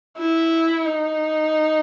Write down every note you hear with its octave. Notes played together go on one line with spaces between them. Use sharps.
E4
D#4